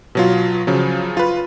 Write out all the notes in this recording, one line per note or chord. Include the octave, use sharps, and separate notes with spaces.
B2 F#3 F4
C#3 F3 F#3
F4 B4